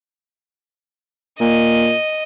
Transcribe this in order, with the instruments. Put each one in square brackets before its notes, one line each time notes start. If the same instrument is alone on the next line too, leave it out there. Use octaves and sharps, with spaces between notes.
[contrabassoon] A#2 [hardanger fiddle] D#5